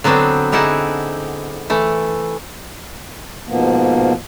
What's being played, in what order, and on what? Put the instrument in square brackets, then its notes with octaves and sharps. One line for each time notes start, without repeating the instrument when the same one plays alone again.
[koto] D3 F#3 B3 C4 D4
D3 D#4 E4 G#4 D5 F#5
E3 A3
[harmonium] G#2 B2 F3 A#3 B3